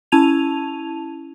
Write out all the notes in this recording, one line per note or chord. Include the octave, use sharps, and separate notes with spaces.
C#4 E4 A5 G#6 D#7 F7